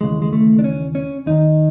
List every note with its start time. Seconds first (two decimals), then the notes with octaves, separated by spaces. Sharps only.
0.01 D#2 C#3 E3 G#3
0.22 G#3
0.33 A3
0.59 D4
0.64 C#4
0.95 C#4
1.26 D#2 D#3 D#4